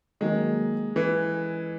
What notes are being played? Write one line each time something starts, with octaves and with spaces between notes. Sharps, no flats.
D#3 F#3 G#3 A#3
E3